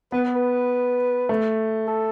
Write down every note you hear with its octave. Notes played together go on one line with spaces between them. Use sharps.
B3 B4
B4
A3
A4